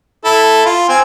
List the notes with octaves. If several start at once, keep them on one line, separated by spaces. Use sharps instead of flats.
E4 A4
F4
C4 G#5